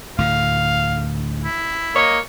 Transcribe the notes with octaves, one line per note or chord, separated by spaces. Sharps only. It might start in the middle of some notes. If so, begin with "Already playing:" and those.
D2 A2 D3 F5
E4
A#3 C#5 D#5